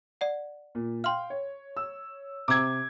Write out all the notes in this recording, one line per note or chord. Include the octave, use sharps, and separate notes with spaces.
D5 F#5
A#2
F5 G5 C6 F6
C#5
E6
C3 C4 A#5 D6 E6 G#6